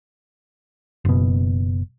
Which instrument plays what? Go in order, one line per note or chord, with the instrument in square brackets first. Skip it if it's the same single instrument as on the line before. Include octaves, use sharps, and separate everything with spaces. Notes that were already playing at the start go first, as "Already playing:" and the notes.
[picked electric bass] F#1 B2